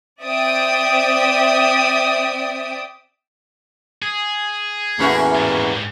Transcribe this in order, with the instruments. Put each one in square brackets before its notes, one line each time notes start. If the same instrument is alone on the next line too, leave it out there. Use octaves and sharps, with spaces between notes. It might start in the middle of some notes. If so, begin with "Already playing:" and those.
[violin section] C4 D5 E5 G5 D#6 D7
[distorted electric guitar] G#4
[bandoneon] E2 A#3 [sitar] A2 C#4 F#4
[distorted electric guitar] G#2 G3